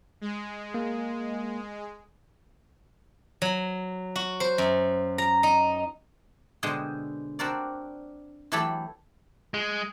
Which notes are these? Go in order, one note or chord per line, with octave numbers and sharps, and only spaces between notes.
G#3
A#3
F#3
F#4
C5
F#2
A#5
D#4
B2 D3 G#3 G#4 C5 G5
C4 D4 F#4 A#4 C5 D5
E3 F#3 A3 G4 A4 B5
G#3